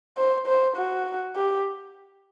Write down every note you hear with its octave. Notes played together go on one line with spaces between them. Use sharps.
C5
C5
F#4
G4